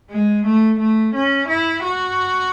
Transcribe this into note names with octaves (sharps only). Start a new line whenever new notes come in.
G#3
A3
A3
C#4
E4
F#4